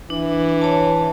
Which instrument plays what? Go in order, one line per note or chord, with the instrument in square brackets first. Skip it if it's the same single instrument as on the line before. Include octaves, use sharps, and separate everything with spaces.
[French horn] E3 [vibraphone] D4
[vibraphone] C#5 A5